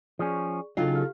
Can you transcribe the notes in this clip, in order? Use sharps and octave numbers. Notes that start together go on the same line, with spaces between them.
F3 C#4 G#4 D5 C#6
C#3 F#3 D4 D#4 F4 A4 G5 C7
G4 F5 F6